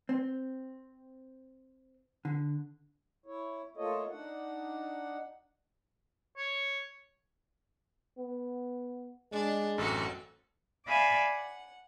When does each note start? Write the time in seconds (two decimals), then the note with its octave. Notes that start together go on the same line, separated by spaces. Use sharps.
0.09 C4
2.25 D3
3.26 E4 C#5
3.77 A3 A#3 F4 A4 C#5 D#5
4.09 D4 D#4 F#5
6.37 C#5
8.18 B3
9.32 G#3 D4
9.78 A1 F#2 C4 F#4 A4
10.87 D5 E5 F5 G#5 B5 D6
11.28 F#5